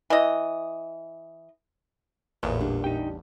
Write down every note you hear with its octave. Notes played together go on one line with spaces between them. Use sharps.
E3 D#5
A1 E2 A#2
G3 D4
D#4 G4 G5